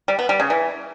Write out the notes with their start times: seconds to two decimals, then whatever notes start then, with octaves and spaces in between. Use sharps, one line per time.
0.08 G3
0.19 B3
0.29 G3
0.40 C#3
0.50 E3